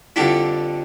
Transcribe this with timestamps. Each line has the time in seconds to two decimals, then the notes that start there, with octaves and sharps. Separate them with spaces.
0.16 F2 D3 G3 D4 E4